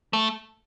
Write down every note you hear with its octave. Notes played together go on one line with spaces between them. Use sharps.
A3